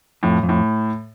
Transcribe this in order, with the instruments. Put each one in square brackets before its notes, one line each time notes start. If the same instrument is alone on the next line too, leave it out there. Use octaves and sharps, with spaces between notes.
[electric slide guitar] F2 [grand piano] A2
[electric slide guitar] F2
[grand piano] A2